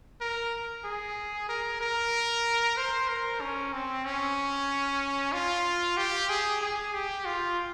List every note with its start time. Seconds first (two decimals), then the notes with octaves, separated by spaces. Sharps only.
0.21 A#4
0.84 G#4
1.49 A#4
1.81 A#4
2.77 C5
3.08 A#4
3.41 C#4
3.73 C4
4.05 C#4
5.32 F4
5.97 G4
6.29 G#4
6.61 G#4
6.94 G4
7.25 F4